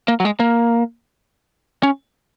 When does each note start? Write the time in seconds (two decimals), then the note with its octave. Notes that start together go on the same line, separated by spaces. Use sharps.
0.08 A#3
0.20 F#3
0.25 G#3
0.40 A#3
1.83 C#4